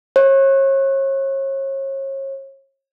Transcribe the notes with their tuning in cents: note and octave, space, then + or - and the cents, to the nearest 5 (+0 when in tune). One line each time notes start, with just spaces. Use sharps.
C#5 -35